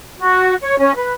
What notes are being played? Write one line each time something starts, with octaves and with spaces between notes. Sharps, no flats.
F#4
C#5
C#4
B4